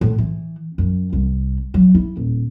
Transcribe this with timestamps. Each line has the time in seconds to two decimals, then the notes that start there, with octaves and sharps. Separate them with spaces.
0.01 A2
0.18 E3
0.78 F#2
1.13 C2
1.74 F#3
1.95 E4
2.17 D#1